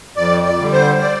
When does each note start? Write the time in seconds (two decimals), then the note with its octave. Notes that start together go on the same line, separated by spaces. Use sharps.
0.16 F2 D5
0.44 D5
0.59 D3 G3
0.73 C5
1.01 D5